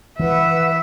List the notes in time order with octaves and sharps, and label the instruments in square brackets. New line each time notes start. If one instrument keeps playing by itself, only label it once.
[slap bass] E3 [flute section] B4 F#5 [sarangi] E5